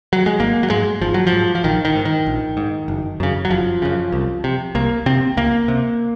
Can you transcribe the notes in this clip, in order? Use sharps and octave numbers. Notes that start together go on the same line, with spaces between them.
F#3
G#3
G#1 A#3
F#3
G#2 G#3
G#1 F3
F#3
F3
G#2
F3
A#1 D#3
D#3
G#2
D#3
A#1
G#2
F#1
F#2 C#3
F#3
F#1 F3
F#2 C#3
C2
C3
C2 A#3
C3 C4
C#2 A#3
C3